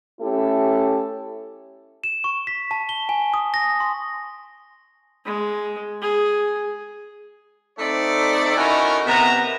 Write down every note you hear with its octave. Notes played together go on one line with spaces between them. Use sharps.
A3 C#4 E4 G4 A4
E7
C#6
B6
A5
G7
G#5
D#6
A#6
C6
G#3
G#4
A3 C4 D#4 A4 D5
C#4 D#4 E4 F#4 A4 A#4
C3 B3 A#4 E5 A#5